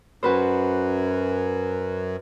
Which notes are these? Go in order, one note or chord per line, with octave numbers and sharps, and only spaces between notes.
F#2 F#4 B4 C5